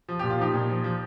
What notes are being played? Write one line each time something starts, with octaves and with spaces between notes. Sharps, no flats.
F3
A#2 G4
F4
F3 D#4 G4
A#2
F3
F3